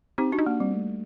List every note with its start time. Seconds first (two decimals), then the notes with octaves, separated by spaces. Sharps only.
0.18 C4 D#4 G4
0.32 D4 F#4
0.39 D#4
0.46 A#3 D4
0.60 G3 C4
0.74 A3